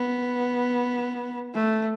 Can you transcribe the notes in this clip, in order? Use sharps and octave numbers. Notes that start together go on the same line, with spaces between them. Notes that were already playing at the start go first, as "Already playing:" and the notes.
Already playing: B3
A3